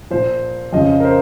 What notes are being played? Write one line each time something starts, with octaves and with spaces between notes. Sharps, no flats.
A#2 F3 C5
F2 C#3 F3 D#5
A#4
C5